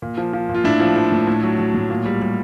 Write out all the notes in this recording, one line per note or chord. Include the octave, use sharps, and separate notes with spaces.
A#2
F3
F3
A#2
F4
A2 D4 E4
F3
F3
A2
A2
F#3
F#3
A2
A#2
G3
G3